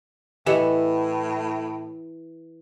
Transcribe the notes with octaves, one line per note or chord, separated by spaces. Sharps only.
A2 E3 G4 D#5 C#7